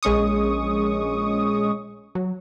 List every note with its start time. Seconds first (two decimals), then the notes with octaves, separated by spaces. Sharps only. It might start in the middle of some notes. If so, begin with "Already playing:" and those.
0.03 A#1 G#3 C#4 C#6 D#6
2.15 F#3